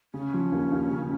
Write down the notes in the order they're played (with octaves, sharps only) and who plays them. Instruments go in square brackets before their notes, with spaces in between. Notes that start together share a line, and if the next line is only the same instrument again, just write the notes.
[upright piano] C#3 [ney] C#4
[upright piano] F3
D#2
D#2
C#3